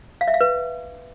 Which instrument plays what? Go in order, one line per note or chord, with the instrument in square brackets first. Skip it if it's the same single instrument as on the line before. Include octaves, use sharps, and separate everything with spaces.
[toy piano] F5
E5
F5
B4